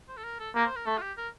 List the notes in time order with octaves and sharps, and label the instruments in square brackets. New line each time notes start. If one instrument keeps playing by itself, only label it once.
[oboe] C5
A4
A#4
A4
[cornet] A#3 [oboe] G4
[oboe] C5
A#4
[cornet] A3 [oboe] A4
[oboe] F4
G4
A#4